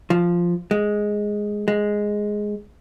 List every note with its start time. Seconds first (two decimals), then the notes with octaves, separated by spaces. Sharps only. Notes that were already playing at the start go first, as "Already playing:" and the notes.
0.10 F3
0.71 G#3
1.68 G#3